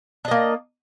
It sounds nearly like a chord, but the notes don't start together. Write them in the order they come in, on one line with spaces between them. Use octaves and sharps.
D4 D#5 A#3